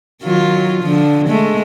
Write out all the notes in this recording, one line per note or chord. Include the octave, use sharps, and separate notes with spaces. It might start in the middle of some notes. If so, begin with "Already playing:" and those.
D#3 F#3 F4
D3 F3
G#3 A3